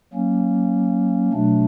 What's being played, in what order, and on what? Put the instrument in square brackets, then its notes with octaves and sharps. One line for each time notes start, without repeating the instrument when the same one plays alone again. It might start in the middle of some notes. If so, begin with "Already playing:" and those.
[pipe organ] F#3 A#3 C#4
B2 F#3 A3 D4